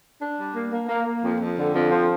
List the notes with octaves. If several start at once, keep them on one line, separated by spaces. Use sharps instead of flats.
D4
G3
A#3
A#3
A#3
A#3
F2
F2
D3
F2
F3